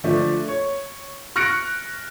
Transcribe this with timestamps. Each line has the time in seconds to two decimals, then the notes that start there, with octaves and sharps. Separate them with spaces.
0.04 D3 F3 A3 D4
0.48 C#5
1.36 C#6 F6 F#6 A#6 C#7 D7